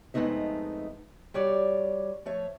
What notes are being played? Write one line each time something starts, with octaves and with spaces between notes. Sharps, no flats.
F2 G#3 A3 B3 D#4 E5
G3 F#4 C#5 D5
F3 A3 C#5